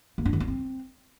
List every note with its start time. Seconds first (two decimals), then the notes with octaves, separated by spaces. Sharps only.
0.18 A#3
0.25 D4
0.33 D#3
0.40 B3
0.48 C4